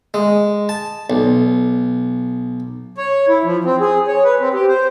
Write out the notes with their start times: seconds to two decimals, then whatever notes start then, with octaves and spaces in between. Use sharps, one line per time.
0.14 G#3
0.69 A5
1.10 B1
2.98 C#5
3.28 E4
3.44 F3
3.64 C4
3.80 G#4
4.07 C#5
4.24 B4
4.40 C4
4.54 G4
4.68 C5